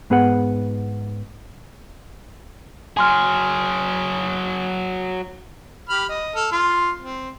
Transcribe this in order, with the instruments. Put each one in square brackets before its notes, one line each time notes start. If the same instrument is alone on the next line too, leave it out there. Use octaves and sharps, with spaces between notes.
[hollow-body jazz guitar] G#2 B3 G#4 B4 F#5
[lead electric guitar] F#3 G#4 [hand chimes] G#5 C6 F6
[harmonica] G4 B5 F6
D#5
A4 F6
F4 C6 F6
C4